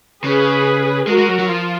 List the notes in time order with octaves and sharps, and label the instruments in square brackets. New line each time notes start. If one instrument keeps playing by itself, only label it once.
[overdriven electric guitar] C#3 [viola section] G#4 B4
[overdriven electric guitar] G#3 [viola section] F#4 A#4
[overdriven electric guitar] G#3
F#3
F#3
[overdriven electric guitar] F3 [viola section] F4